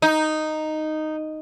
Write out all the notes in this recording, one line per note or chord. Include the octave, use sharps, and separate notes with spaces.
D#4